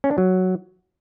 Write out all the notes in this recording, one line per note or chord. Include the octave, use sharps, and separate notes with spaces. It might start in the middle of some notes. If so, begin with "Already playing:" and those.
C#4
D4
F#3